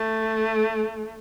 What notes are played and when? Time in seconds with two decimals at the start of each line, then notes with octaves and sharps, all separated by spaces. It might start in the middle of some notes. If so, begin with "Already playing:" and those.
Already playing: A3